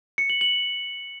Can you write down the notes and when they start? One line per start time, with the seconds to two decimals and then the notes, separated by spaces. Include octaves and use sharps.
0.18 C#7
0.30 F#7
0.41 F#7